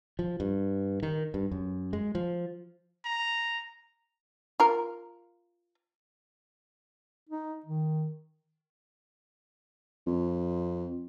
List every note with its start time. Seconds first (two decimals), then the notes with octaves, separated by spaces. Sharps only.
0.19 F3
0.40 G2
1.03 D#3
1.34 G2
1.51 F#2
1.93 G#3
2.15 F3
3.05 A#5
4.60 F4 A#4
7.29 D#4
7.66 D#3
10.07 F2